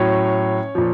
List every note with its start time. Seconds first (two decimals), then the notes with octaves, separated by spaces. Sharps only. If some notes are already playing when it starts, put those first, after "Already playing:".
Already playing: A2 F#3 C#4 C#5
0.75 A#2 F3